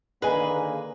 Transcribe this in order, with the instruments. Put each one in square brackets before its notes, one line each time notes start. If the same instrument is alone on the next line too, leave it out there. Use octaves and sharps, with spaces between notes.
[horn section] D3 D#3 A#3 [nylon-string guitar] G#4 D#5 G#5 [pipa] B4